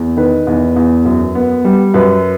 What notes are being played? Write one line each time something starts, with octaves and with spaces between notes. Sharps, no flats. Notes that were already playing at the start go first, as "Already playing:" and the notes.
Already playing: E2
D#3 B4
E2
E2
F#2
B3
G3
F#2 B4